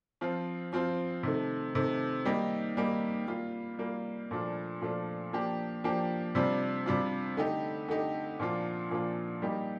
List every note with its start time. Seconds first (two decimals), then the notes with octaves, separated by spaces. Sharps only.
0.21 F3 C4 F4
0.73 F3 C4 F4
1.23 C3 D#3 A3
1.75 C3 D#3 A3
2.25 D#3 G3 A#3 D#4 G4
2.77 D#3 G3 A#3 D#4 G4
3.27 G3 A#3 F4
3.79 G3 A#3 F4
4.31 A#2 F3 A3 D4 F4
4.81 A#2 F3 A3 D4 F4
5.33 F3 A#3 D4 G4
5.84 F3 A#3 D4 G4
6.35 C3 G3 D4 F4
6.86 C3 G3 D4 F4
7.37 D3 A3 D#4 G4
7.89 D3 A3 D#4 G4
8.39 A#2 F3 A#3 D4 F4
8.90 A#2 F3 A#3 D4 F4
9.42 G3 A#3 D#4 G4